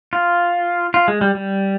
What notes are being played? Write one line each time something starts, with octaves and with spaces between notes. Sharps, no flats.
F4
F4
G#3
G3
G3